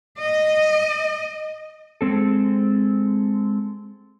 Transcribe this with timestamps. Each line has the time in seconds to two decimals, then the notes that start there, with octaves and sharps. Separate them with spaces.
0.18 D#5
2.01 G#3 C4 A4